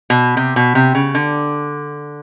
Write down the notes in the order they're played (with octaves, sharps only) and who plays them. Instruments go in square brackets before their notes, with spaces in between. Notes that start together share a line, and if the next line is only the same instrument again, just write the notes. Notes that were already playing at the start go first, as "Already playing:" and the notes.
[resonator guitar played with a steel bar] B2
C3
B2
C3
C#3
D3